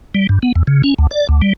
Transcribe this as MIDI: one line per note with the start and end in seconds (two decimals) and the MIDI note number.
0.15 0.27 55
0.29 0.39 43
0.43 0.52 59
0.55 0.63 40
0.67 0.82 49
0.84 0.94 61
0.99 1.07 38
1.11 1.27 74
1.29 1.41 38
1.42 1.53 55